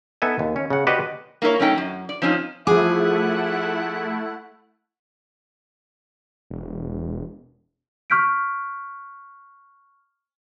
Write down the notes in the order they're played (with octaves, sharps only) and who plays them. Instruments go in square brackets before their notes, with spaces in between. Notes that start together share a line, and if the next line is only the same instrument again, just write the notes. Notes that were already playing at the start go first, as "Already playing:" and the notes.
[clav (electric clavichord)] B3 D#4 A4 E5 G#5
D#2
C#4
C#3 F#5
F#4 G4 B4 C5 D5 D#5
[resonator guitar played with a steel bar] A#3 E4 F4 A#4 C#5
F#2 A3 C#4 D#4 G5
F#2
D5
F3 C4 C#4 D#4
[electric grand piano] F3 D6 [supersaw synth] A3 E4 [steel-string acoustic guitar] G#4 [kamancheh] F#5
[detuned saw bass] E1
[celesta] C#6 F6 G6 B6 D7